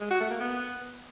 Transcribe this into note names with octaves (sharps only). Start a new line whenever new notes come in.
G#3
F#4
A3
A#3
B3